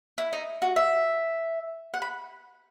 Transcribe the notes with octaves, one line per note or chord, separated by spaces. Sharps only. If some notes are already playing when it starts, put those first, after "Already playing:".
E4
D#4
F#4
E5
F#5
B5